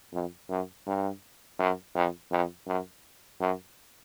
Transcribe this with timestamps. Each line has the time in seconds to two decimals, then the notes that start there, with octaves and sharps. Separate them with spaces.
0.13 F2
0.49 F#2
0.87 G2
1.59 F#2
1.95 F2
2.32 F2
2.67 F#2
3.40 F#2